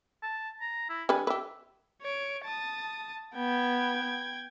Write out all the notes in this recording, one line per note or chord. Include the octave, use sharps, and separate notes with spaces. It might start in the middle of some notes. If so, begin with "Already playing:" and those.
A5
A#5
E4
G3 D4 B4 G#5
G4 B4 E5
C#5 D7
A5 D#6
B3 G5 G#6